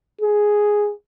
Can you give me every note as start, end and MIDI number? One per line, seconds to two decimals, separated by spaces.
0.21 0.92 68